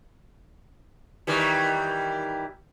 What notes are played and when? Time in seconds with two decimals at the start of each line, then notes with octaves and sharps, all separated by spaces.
1.27 D#3 E3 G3